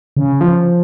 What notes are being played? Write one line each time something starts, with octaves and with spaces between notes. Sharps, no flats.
C#3
F3